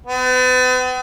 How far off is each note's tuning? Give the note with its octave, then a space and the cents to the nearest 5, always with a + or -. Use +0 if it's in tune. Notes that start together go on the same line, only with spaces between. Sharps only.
B3 +45